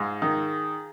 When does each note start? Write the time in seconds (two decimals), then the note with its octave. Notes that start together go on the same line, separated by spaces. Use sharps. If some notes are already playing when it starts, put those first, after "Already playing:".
Already playing: G#2 F4 G#4
0.22 D#3